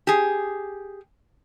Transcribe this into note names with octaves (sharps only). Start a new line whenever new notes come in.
G4 G#4